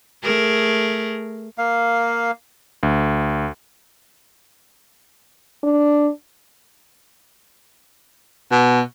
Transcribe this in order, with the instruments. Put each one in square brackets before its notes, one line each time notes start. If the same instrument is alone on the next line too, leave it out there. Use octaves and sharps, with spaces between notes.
[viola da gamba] A3 G#4 A#4
[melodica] A#3 F5
[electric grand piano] D2
[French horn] D4
[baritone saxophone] B2